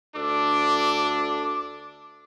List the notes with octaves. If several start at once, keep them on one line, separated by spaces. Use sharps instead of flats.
D2 D4 A4 D6